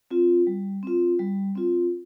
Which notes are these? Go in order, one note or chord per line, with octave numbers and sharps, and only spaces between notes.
C4 F4
G3
C4 F4
G3
C4 F4